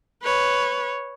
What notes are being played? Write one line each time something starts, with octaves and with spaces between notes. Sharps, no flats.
B4 C#5